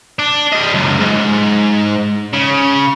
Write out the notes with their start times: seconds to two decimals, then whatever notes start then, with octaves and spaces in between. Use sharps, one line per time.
0.19 D4
0.52 G3 D#5
0.74 C#2 F#2
1.00 G#2
2.33 C#3